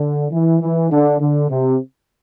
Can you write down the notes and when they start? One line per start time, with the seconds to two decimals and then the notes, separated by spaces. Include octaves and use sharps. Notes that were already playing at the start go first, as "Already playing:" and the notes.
Already playing: D3
0.31 E3
0.61 E3
0.90 D3
1.21 D3
1.49 C3